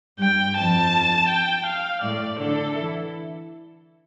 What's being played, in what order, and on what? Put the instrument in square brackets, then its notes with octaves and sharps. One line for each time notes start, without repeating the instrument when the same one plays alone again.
[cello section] G2 G3 [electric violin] G5
[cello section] F2 F3 [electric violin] A5
[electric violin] G5
F5
[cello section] A2 A3 [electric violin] D5
[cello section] D3 D4 [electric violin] A4
[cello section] E3 E4